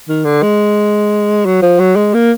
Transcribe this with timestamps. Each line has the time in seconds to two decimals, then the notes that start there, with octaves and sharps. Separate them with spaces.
0.08 D#3
0.24 D3
0.43 G#3
1.45 F#3
1.62 F3
1.80 F#3
1.96 G#3
2.14 A#3